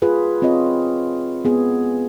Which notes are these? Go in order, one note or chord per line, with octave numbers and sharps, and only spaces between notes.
F4 G#4 B4
C4 F4 C#5 D#5
B3 G#4